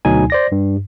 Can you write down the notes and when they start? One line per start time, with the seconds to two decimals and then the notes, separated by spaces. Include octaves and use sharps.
0.05 D2 B2 F#3 D#4 G#5
0.30 C5 D5 A#6
0.52 G2